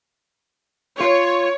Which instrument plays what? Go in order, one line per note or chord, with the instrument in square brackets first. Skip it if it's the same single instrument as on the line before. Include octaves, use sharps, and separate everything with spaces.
[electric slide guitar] F4 [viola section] C#5